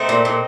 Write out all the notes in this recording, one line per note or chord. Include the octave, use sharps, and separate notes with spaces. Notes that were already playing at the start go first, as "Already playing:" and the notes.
Already playing: A3 C4 D#4
A#2
A#2